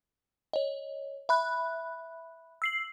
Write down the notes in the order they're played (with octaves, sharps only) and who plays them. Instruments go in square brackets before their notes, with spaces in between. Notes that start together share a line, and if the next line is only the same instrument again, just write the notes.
[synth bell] C#5 D#5
E5 B5 F#6
E6 C7 F#7